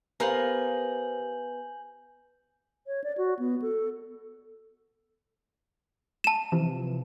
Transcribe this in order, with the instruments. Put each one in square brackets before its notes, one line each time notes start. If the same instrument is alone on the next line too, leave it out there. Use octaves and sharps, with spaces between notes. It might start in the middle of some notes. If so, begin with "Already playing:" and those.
[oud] B3 F5 [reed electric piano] G4 C5 [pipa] A#4 [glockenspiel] G#5 G6 F#7
[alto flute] C#5
D5
F#4
B3
A4
[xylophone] A5 E7
[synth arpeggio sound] C3 E3 F3